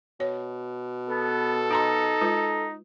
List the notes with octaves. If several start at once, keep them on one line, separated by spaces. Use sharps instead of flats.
B2 C#5
B3 A4
D#4 F#4 A#5 C6
G#3 F4 B4